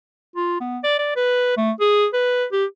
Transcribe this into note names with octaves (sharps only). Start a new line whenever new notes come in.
F4
B3
D5
D5
B4
A3
G#4
B4
G4